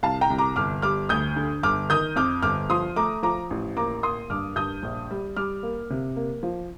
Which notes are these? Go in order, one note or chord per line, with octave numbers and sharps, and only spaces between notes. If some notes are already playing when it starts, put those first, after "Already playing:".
C2 F5 A5
G5 A#5
C2
A#5 D6
G1 D6 F6
G3 D6 F6
D2 D#6 G6
D3
G1 D6 F6
D#3 D#6 G6
F2 D6 F6
G1 D6 F6
F3 C6 D#6
A3 A#5 D6
F3 A#5 D6
A1
A#3 A#5 D6
A#3 C6 D#6
G2 D6 F6
G2 D#6 G6
A#1
G3
G3 D6 F6
A#3
C3
A#3
F3